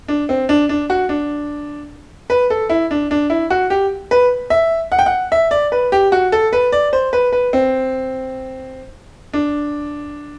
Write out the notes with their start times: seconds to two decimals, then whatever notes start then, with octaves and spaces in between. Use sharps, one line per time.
0.08 D4
0.29 C4
0.49 D4
0.69 D4
0.90 F#4
1.09 D4
2.30 B4
2.50 A4
2.70 E4
2.91 D4
3.11 D4
3.30 E4
3.50 F#4
3.70 G4
4.11 B4
4.50 E5
4.92 F#5
4.99 G5
5.06 F#5
5.32 E5
5.51 D5
5.72 B4
5.92 G4
6.12 F#4
6.32 A4
6.53 B4
6.72 D5
6.93 C5
7.13 B4
7.32 B4
7.53 C4
9.33 D4